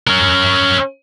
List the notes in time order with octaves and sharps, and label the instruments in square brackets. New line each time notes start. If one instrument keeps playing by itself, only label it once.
[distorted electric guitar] C#4 A#4